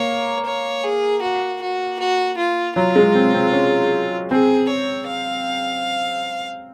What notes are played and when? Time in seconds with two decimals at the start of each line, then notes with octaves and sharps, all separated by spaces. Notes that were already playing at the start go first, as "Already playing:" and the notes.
Already playing: A#3 C#5
0.45 C#5
0.83 G#4
1.22 F#4
1.61 F#4
1.99 F#4
2.37 F4
2.76 F#3 F4
2.96 G#3
3.15 C4
3.34 C4
3.53 C#4
4.30 C4 G#4
4.69 C#5
5.08 F5